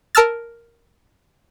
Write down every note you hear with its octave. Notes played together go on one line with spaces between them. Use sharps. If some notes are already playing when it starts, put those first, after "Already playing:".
A#4 A5 E6 F6 A6